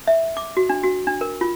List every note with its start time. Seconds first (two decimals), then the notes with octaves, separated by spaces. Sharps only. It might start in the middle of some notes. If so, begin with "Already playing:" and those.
0.07 E5
0.37 D6
0.57 F#4
0.69 D4
0.84 F#4
1.07 D4
1.21 A#4
1.41 F4